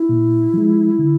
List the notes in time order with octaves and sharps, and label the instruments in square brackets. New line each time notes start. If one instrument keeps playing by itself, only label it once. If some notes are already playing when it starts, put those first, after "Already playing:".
Already playing: [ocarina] E4
[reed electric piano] A#2
F3 G#3
D3